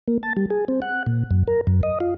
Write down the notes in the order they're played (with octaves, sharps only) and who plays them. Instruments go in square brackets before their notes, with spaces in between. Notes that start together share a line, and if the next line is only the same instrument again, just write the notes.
[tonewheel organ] A#3
A5
G3
G#4
C4
F#5
A#2
F#2
A#4
F#2
D#5
F4